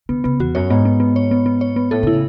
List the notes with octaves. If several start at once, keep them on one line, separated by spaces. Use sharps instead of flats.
D3 B3
C#3 B3
E2 F#4
F#2 C#5
G#2 B3
B3
B3
C#5
B3
B3
C#5
B3
A2 A4
D3 E4
C#3